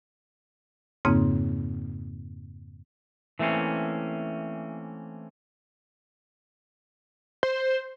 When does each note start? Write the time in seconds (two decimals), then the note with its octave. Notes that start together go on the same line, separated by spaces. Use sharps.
1.05 F2 G#2 C#3 A#3 C4 D#4
3.39 E3 A3 A#3 C4 C#4
7.43 C5